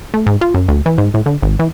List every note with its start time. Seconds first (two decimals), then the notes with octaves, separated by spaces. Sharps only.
0.14 A3
0.26 G#2
0.41 F4
0.54 F#2
0.68 D2
0.86 E3
0.98 G#2
1.14 A2
1.26 D3
1.42 G#1
1.59 E3